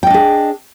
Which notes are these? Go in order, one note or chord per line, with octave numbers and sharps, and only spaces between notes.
D4 G#4 D#5 G5